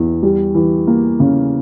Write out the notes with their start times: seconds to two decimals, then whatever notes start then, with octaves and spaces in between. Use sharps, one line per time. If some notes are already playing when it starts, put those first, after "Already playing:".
Already playing: E2
0.23 G3
0.55 E3
0.87 A#3
1.20 C#3